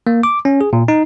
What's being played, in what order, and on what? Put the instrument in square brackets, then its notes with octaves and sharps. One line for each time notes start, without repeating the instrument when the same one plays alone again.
[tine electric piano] A#3
D6
C#4
G#4
A#2
D#4